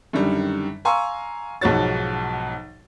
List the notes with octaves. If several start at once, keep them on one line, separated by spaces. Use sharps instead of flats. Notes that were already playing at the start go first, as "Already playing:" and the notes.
F#2 D3 D#3 G3
F5 G#5 A#5 C6 C#6 E6
B1 G#2 F3 F#4 C#5 A6